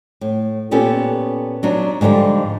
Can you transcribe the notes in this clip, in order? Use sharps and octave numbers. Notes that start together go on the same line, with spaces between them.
A2
A#2 B3 C#4 G4 A4
F#3 B3 D4 D#4
G#2 D3 F3 G3 D#4